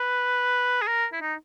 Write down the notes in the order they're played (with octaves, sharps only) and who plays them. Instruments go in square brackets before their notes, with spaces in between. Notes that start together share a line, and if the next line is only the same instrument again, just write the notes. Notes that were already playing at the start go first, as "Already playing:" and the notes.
Already playing: [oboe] B4
G#4
A#4
E4
D#4